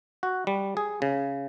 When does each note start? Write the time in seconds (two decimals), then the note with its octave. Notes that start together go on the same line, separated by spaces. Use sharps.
0.23 F#4
0.47 G3
0.77 G#4
1.02 C#3